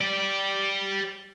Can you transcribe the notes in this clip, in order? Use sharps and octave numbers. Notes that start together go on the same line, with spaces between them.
G4 D5